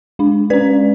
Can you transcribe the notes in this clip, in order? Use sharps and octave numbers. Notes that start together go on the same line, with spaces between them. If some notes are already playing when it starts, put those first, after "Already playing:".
G#3 D4
G#3 C#4 B4 D5